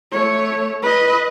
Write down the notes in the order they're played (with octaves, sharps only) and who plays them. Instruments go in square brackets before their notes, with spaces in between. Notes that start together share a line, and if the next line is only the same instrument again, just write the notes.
[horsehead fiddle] A3 C#5
B4 D#5